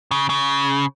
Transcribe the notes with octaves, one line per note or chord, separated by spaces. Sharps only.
C#3
C#3